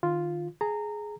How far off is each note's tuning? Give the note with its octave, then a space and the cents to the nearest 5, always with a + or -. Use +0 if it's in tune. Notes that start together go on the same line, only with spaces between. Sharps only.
D#3 -25 F4 +0
G#4 +10 A#5 -20